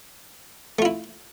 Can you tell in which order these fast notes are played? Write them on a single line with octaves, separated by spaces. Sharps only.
A3 F4 E4